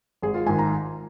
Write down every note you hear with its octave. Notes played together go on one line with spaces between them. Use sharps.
G#1 G#4
F4
G#2 D#3 G#5
A#5